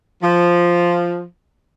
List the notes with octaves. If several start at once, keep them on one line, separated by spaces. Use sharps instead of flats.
F3